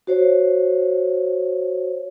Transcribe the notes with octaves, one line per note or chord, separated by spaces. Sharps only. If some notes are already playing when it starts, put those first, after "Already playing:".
F#4 C5 C#5